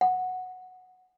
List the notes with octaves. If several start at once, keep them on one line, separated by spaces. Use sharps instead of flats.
F#5